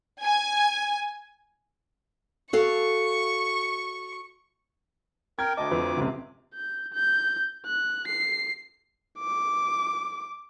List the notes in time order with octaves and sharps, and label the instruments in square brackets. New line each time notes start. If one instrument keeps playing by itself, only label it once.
[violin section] G#5
[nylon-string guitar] F#4 A4 F5 [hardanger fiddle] C#6
[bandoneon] A#4 G5 [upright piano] G#6
[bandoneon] D2 D6 [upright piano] D#5 A5
[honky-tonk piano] F2 [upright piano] B4
[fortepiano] C#2 C3
[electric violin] G6
G6
F#6
C7
D6